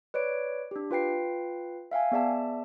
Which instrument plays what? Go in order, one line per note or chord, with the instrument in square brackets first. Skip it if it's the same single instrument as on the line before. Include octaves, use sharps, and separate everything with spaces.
[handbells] B4 C#5 D5 D7
D4 G4
F4 B4 G5 C7
E5 F5 G5 G#5
B3 G#4 D5 E5 A5